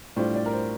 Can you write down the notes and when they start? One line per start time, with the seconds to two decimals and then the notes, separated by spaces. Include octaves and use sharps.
0.16 A2 G3 D4 F4 C5
0.36 D5
0.46 A#4
0.53 C5